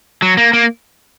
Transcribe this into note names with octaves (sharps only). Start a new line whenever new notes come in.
F#3
A#3
A#3